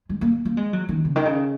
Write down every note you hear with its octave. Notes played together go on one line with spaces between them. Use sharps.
G#3
A#3
A#3
G#3
F#3
D#3
C#3
D#3
C#3